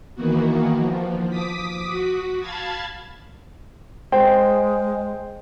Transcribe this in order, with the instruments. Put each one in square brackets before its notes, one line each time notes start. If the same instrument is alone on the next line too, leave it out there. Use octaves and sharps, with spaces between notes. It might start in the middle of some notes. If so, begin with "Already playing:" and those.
[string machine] D#3 E3 A#3 B3 F#4
F3
D6 D#6 B6
F#4
F5 A5 B5 G#6 A6
[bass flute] G#3 [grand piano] C5 G5